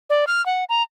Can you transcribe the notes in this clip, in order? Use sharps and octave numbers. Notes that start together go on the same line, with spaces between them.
D5
F6
F#5
A#5